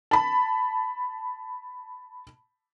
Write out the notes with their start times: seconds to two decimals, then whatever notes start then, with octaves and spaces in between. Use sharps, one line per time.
0.11 A5 B5